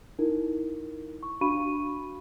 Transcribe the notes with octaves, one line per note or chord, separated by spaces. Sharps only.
D#4 E4 A#4
C#6
D4 F#4 F5 B5 C#6 D#7